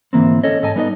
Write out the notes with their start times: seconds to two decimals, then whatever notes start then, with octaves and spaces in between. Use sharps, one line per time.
0.13 D2 G#2 E3 A#3 C4
0.44 C#4 A4 C#5 D#5
0.62 G#2 A4 D#5 G#5 A5
0.76 G3 B3 D#4 C5 D#5